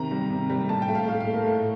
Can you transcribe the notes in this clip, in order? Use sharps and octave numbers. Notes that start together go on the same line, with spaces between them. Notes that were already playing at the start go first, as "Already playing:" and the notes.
Already playing: C3 D#3 A#5
G3
C3
G3
A2 A5
G5
A3
F5
A2 F5
F5
A3
A#4
A2